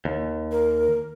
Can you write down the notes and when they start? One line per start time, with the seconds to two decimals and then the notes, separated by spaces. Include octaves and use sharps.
0.05 D#2
0.52 A#4